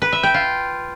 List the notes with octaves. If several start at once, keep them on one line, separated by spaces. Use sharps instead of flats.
B4
E5
G5
F4